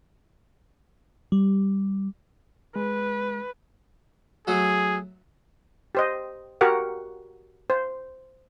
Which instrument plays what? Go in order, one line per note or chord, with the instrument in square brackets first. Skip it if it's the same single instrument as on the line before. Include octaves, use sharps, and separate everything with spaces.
[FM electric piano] G3
[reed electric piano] G#3 [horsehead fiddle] B4
[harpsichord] F#3 A3 F#4 [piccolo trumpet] G#4
[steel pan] G4 C5 D#5
F#4 G4 A#4 F#5
C5